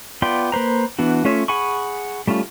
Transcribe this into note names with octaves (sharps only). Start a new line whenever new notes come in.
B3 F4 D5 G5 C6
A#3 B4 C5 A#5
E3 B3 D4 F#4
A3 C#4 F4 C#5 E5
G#4 F#5 G#5 B5 C#6
G3 A3 C#4 F4